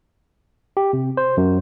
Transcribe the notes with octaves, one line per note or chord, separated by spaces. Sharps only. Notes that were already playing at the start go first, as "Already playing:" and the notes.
G4
C3
C5
F#2